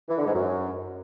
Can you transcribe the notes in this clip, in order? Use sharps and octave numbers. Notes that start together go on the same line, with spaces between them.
E3
D3
G#2
F#2